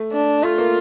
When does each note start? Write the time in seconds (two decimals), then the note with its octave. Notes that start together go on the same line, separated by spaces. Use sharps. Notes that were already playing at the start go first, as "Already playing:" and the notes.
Already playing: A3
0.12 D4
0.43 A3 F4
0.58 A#3